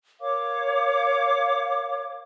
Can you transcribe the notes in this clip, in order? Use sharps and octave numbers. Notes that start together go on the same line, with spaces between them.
A#4 C#5 F5 D6